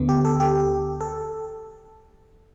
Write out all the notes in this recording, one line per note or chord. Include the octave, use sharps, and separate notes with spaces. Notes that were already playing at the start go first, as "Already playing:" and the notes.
Already playing: D2 D3 B3
G4
A4
G4
A4